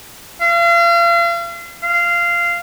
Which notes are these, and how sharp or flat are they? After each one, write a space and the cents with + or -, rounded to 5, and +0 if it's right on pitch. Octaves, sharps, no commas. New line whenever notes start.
F5 -40
F5 -15